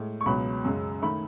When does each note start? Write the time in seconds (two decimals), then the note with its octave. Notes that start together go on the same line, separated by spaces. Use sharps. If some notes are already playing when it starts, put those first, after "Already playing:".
Already playing: A2 G#3
0.21 C#6
0.26 C#2 B2 F#3 B5
0.64 F#2 C#3 G#3
1.02 D#3 A3 B5